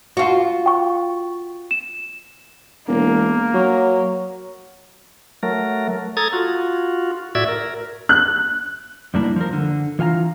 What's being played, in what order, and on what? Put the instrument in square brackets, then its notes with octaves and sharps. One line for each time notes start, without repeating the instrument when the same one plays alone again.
[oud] F4 F#4
[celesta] G5 C#6
E7
[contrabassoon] E1 [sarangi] A#3
[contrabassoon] F#3
[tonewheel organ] F#3 A3 A#4
A4 A#5 D#6 G#6 A6
F4 F#4
A2 F#4 D5 E5 E6 G#6
A#4
[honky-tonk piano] F#6
[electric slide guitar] F#2 G3 A#3 D4 E4
F3 A#4
D3
E3 F4 F5 G#5 A#5